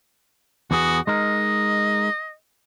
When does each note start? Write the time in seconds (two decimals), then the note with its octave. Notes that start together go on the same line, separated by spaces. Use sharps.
0.71 E2 B3 F#4 G#4
1.07 G#3 D#4 A#4 D#5